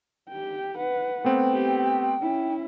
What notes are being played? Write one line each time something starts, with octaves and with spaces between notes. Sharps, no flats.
G4 G5
B4 F#5
A3 B3 C4 G5
G4
C#4 E4